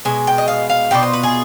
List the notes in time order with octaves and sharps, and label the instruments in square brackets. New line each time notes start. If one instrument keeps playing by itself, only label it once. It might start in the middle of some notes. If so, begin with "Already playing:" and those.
[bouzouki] B2 G#3 G#5
G5
D#5
F5
F5
B2 B3 D4 F4 G5
C5
B4
G#4